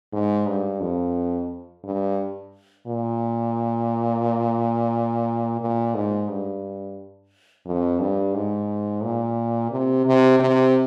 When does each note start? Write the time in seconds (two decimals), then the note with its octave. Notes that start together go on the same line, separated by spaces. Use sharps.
0.13 G#2
0.47 G2
0.81 F2
1.84 G2
2.87 A#2
5.61 A#2
5.95 G#2
6.29 G2
7.66 F2
8.00 G2
8.35 G#2
9.04 A#2
9.72 C3
10.06 C3
10.40 C3